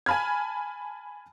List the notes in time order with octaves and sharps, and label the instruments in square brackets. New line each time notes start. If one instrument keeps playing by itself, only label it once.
[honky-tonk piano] G#5 A5 B5 F6 G#6